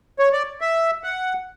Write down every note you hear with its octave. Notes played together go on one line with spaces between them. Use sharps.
C#5
D5
E5
F#5